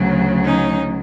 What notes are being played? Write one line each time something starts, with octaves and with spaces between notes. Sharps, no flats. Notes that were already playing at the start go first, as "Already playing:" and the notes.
Already playing: D2 C#3 F#3
C#4 D#4